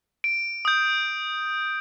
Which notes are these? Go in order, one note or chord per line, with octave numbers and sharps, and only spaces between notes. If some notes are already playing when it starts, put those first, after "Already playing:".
D7
D#6 G6